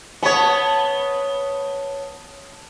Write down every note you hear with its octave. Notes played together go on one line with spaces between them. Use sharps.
B3 C#5 A5 D#6